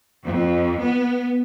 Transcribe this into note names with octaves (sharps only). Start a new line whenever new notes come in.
F2
B3